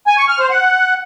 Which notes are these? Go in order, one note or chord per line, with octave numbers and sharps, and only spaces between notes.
G#5
C#6
F6
C5
F#5